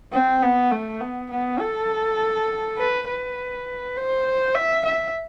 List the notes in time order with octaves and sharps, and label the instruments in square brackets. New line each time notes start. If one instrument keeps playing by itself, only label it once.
[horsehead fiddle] C4
B3
A3
B3
B3
A4
B4
B4
C5
E5
E5